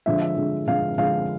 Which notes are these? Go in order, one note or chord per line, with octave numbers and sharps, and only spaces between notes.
D3 F3 G#3 E5
E5
D3 F3 G#3
D3 F3 G#3 F5
D3 F3 G#3 F5